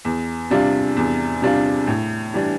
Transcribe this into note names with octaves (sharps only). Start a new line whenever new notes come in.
E2
C3 G3 D4 F4
E2
C3 G3 D4 F4
A2
E3 G3 D4